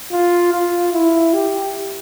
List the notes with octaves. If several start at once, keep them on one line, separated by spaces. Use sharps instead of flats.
F4
F4
E4
G4